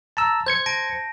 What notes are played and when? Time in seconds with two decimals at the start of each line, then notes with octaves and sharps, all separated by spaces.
0.17 A5 A#5 E6
0.46 C5 G6 G#6 C#7
0.66 A5 A#6 D7